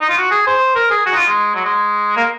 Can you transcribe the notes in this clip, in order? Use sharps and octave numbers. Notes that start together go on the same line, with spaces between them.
D#4
F4
F#4
G#4
C5
A#4
G#4
F#4
D#4
F4
G#3
F#3
G#3
A#3